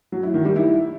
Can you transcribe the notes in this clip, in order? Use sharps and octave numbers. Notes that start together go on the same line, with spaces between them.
F#3
E4
D#3
G3
E4